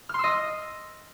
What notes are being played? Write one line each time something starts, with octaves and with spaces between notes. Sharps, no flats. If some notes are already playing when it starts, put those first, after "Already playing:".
D#5 C6 E6 F6